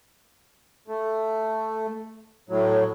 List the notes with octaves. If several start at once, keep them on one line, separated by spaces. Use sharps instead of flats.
A3
A2 F#3